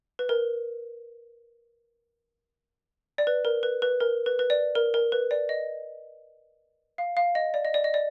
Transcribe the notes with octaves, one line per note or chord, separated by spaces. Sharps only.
B4
A#4
D5
B4
A#4
B4
B4
A#4
B4
B4
D5
A#4
A#4
B4
D5
D#5
F5
F5
D#5
D5
D#5
D5
D#5
D5